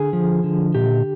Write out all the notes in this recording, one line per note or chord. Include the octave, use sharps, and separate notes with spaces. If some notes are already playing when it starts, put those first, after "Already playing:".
Already playing: D3 G#4
F3
D3
A#2 G4